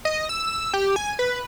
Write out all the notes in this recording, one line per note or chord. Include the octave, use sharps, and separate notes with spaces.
D#5
E6
G4
G#5
B4